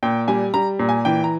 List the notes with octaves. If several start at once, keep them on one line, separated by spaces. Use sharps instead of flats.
A#2 G5
G3 G#5
G3 A#5
A#2
G#5
E3 G5
A#5